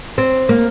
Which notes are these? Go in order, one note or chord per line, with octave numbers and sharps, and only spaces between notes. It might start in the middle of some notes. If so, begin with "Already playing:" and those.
C4
A#3